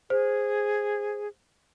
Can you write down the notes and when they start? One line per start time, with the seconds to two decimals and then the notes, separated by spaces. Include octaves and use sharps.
0.10 G#4 C5